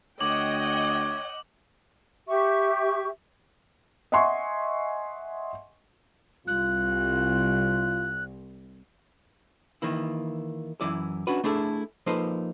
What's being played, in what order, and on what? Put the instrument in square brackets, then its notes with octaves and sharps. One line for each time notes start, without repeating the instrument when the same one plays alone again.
[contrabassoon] D2 [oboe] C#5 [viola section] D#5 F#5 G5 [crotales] D6 F#7
[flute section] G4 E5 C#6
[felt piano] D#5 E5 F#5 G#5 C6 C#6
[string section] C2 [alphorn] F4 [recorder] F#6
[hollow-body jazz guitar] D#3 E3 A#3 E4
F#2 E3 E4 D5
C#4 D4 F#4 B4
A3 D4 E4 G#4 A4
F3 A#3 D#4 A4 B4 C5